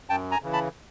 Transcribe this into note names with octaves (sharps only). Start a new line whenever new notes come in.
F#2 G5 A5
G#5 A#5
C#3 E3
A5 B5